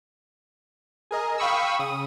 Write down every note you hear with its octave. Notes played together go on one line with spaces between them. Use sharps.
G#4 A#4 D#5
F5 G5 B5 C#6 D#6 E6
C#3 D#6